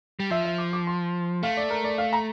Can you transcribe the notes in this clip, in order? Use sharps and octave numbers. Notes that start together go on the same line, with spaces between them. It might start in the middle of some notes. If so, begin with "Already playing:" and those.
G3
F3 E5
E5
D6
D6
C6
A3 F5
D5
A#4
D5
F5
A#5